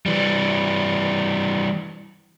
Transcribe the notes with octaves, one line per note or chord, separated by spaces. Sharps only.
E3 G3